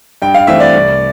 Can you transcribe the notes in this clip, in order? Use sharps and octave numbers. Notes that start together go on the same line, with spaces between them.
G2 G5
F5
E3 A3 C4 E5
D5
C2